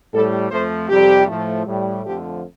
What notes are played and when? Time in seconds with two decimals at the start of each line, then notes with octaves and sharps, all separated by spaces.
0.14 A2 G3 A4
0.51 F2 F3 A3 C5
0.89 F2 C3 G3 G4
1.28 A2 F3 A3
1.66 A2 G3
2.04 F2 D3 F3 A3 G4